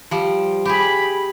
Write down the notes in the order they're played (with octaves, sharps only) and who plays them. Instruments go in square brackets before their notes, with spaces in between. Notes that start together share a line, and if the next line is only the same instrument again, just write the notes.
[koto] F3 G3
[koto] G4 G#4 [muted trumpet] B5